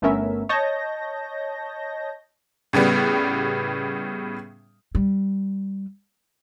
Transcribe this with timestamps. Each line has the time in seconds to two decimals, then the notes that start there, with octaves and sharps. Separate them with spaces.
0.02 G1 A3 B3 C#4 A#4 E5
0.49 C#5 D#5 A5 G6 A#6
2.73 A2 C#3 G3 B3
4.95 G3